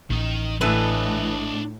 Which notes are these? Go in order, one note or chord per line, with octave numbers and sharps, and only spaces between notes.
A1 D#3 D#5
A2 E3 D4 A4 B4 D#5